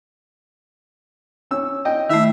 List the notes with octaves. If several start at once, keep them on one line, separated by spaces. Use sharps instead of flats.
C#4 E6
D#5 G5
D#3 A3 E4 E5